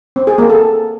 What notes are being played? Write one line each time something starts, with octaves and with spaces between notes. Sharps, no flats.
C4
G#4
A#3
A4